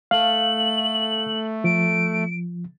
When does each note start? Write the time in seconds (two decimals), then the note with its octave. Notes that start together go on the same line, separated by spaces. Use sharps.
0.11 A3 F5 F#7
1.64 F3 D7